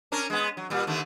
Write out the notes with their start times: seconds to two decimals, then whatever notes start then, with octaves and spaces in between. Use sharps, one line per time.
0.12 C#4 D4 A#4
0.30 G#3 B3
0.57 F#3
0.70 A#2 G3
0.87 D#2 D3 A3